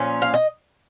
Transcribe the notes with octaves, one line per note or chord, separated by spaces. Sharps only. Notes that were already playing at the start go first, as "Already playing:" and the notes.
Already playing: A#2 F3 C#4
F5
D#5